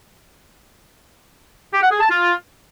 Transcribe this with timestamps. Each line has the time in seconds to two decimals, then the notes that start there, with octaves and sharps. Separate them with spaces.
1.73 G4
1.82 F#5
1.91 G#4
2.00 A5
2.09 F4